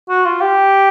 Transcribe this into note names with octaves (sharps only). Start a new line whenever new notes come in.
F#4
F4
G4